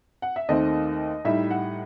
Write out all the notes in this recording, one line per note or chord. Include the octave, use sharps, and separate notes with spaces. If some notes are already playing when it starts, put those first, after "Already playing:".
F#5
E5
D#2 D#3 A3 C4 D#5
A2 G3 D#4 E5
F#5